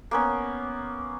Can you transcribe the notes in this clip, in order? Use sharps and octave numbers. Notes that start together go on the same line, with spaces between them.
A#3 B3 C#4